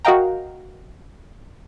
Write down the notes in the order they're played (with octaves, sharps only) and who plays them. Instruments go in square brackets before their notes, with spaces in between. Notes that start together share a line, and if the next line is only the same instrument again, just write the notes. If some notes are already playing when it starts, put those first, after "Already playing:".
[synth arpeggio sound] F#4 A#4 D#5 F5 G5 A#5